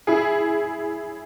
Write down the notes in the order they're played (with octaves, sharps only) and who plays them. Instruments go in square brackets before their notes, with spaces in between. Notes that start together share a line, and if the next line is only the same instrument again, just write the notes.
[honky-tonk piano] E4 G#4